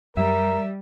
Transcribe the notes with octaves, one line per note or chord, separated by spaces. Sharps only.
F#2 G3 A#4 E5